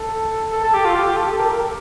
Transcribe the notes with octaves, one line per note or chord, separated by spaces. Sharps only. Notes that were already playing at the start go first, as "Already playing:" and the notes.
Already playing: A4
A4
A4
G4
F4
G4
A4
A#4
A4
A#4
G4